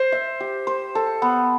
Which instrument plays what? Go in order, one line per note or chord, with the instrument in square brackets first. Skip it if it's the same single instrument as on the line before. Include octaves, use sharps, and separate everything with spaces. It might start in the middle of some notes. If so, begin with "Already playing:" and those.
Already playing: [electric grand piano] C5
[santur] E5
G4
C5
A4
B3